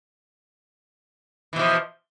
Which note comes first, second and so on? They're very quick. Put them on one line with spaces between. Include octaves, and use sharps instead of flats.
E3 B2 F3